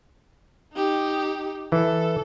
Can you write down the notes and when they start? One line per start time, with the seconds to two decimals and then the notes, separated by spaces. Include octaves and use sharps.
0.74 D#4 G4
1.72 E3 A4